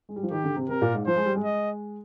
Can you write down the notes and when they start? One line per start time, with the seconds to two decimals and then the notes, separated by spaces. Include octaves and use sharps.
0.09 G#3
0.16 G3
0.23 F3
0.31 D#3 G4
0.44 D3
0.56 C3
0.69 C3 A#4
0.82 A#2
0.94 G#2
1.07 F3 C5
1.17 G#3
1.26 G3
1.35 G#3
1.44 D#5